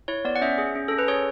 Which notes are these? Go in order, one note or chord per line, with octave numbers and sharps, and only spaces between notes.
E4 C#5
B3 D5
F#5
C#4 E5
G#4
C#4
C#4 A4
B4
G#4 C#5